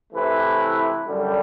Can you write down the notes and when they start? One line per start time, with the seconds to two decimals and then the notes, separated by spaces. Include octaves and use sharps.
0.12 C3 E3 A3 E4 B4
1.05 F#2 D3 G3